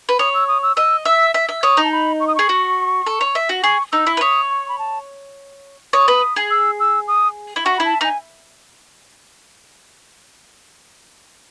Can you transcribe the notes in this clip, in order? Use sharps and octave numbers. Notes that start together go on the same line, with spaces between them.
B4
C#5 D#6
E6
D#6
E6
D#5 E6
E5 E6
E5
E5
C#5 D#6
D#4
A5
B5
C#6
D#6
G#4 C#6
F#4
A4
C#5
E5
F#4
G#4 C#6
D#4 E6
E4
B4
C#5 D#6
C#6
B5
A5
C#5 D#6
B4
G#4
E6
E6
D#6
E4
F#4 C#6
E4 B5
A5
D#4
G#5